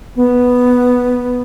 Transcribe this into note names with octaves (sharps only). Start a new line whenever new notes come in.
B3